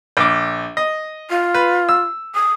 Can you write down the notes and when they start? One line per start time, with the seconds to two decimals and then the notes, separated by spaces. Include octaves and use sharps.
0.17 A#1 D6
0.77 D#5
1.30 F4
1.54 B4
1.89 E6
2.35 D#6